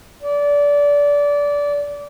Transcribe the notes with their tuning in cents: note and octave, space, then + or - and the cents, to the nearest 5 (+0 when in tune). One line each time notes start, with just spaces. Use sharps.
D5 -20